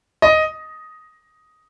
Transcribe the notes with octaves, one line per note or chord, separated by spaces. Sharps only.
D#5